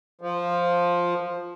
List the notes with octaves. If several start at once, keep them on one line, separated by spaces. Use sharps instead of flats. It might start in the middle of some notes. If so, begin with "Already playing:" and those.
F3